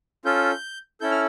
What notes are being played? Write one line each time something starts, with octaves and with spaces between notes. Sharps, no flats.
C#4 F4 A4 G6
C#4 E4 A4 G6
F6